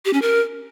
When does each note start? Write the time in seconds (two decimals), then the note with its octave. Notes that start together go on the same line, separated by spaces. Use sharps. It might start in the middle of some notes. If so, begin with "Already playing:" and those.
0.05 G4
0.13 C#4
0.22 A#4